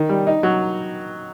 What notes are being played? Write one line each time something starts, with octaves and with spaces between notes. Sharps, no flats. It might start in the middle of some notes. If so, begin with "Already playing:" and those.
Already playing: D#3
G3
D#4
F#3